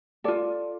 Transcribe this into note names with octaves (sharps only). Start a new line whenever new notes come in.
F4 A4 D5